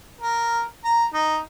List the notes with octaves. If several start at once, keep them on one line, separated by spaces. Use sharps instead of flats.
A#4
A#5
D#4